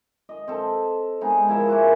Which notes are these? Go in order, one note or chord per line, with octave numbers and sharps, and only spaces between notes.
D#5
C4 A4
G#3 B3 D#4 G#4
F3 E4 A#4 E5
A#3 E4 F#4 G#4